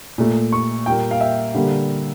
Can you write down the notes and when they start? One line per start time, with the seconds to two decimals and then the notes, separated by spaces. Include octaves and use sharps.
0.18 A#2 A3
0.53 C#6
0.86 A#2 G3 A#3 G5
1.11 F5
1.21 E5
1.54 D3 G3 A#3